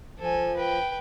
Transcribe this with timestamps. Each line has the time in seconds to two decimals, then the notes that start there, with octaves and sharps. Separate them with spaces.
0.19 F3 A4 G#5
0.57 B4 G5